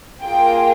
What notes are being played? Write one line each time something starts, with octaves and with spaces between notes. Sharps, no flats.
A#3 F4 G#4 G5